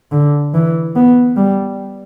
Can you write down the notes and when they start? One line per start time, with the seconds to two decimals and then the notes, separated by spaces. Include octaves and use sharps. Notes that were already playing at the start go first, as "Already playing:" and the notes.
0.12 D3
0.54 E3
0.96 B3
1.37 G3